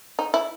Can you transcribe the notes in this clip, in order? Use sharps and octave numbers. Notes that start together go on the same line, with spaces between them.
D#4
E4